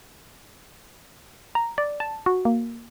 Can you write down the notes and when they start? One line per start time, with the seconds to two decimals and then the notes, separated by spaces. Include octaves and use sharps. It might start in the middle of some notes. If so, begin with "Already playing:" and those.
1.55 A#5
1.78 D5
2.00 A5
2.26 F#4
2.45 A#3